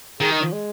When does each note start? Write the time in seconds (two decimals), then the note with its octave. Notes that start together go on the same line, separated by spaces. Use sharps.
0.20 D#3 G#4
0.32 D#4
0.42 F3
0.53 G#3